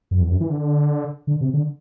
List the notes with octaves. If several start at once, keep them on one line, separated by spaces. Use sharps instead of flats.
F#2
E2
F#2
E3
D3
D3
C3
D3